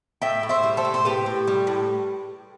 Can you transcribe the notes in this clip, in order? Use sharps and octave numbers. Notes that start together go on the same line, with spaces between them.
A2 E5 G5
A2
C5 E5
G3
A4 C5
A2
C5
A2 G4 B4
A2
G3
A2